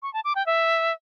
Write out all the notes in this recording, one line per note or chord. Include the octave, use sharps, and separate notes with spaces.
C#6
A5
D6
G5
E5